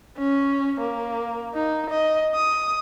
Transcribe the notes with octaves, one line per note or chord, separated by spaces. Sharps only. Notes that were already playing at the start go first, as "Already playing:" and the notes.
C#4
A#3
D#4
D#5
D#6